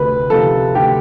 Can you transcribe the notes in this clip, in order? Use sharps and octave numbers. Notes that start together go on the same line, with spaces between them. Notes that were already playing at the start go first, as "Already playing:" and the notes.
Already playing: D2 C3 B4
C3 F3 A4
D2 G4